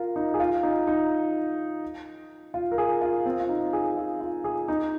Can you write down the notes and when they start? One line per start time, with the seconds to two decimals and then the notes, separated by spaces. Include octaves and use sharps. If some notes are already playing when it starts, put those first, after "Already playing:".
Already playing: F4 A#4
0.16 D#4
0.34 G#4
0.40 F4
0.63 D#4
0.87 D#4
2.54 F4
2.72 A#4
2.78 G#4
3.02 F4
3.26 C4
3.40 F4
3.49 D#4
3.73 G#4
3.97 F4
4.21 F4
4.44 G#4
4.68 D#4